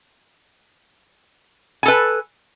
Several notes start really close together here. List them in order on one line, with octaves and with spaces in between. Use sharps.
G#5 A4 B4